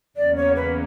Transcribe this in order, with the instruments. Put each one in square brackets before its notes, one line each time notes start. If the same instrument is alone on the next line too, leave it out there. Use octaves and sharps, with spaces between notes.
[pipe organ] E2 C#3 F#3 A#3 C#4 [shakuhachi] D5
[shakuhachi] C#5
B4